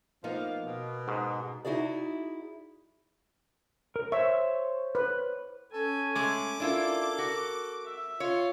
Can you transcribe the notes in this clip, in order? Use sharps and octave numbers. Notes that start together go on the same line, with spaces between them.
F3 A#3 B3 D#4 F5
B2
G#2
D#4 E4 F#4 G#4 D5
A#4
C5 C#5 E5 C#6
B4
C#4 A4 G#5
G#3 A3 D6
D4 E4 F4 A4 A#4
F#4
E5
F4 C#5